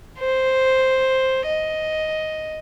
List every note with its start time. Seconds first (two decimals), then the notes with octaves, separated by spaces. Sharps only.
0.19 C5
1.46 D#5